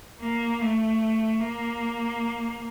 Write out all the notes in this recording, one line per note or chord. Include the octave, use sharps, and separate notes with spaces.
A#3
A3
A#3